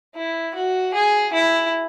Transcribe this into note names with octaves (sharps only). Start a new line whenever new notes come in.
E4
F#4
G#4
E4